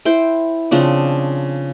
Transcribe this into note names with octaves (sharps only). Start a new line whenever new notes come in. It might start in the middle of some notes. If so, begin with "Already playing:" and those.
E4 C5 G5
C#3 F3 C4 D4